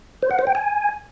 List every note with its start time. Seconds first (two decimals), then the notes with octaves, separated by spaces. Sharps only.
0.22 C5
0.31 F#5
0.39 C5
0.47 G5
0.55 G#5